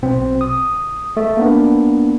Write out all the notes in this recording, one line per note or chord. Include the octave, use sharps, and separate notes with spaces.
B1 B2 C4
D#6
A3
A#3 B3 D4